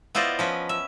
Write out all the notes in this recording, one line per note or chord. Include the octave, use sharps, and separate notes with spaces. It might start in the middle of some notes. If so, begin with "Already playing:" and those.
B3 E4 F4 C5 D5 D#5
F3 C#4 B4
E5